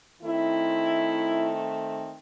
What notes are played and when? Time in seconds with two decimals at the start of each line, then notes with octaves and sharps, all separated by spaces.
0.22 D#3 A3 C4 E4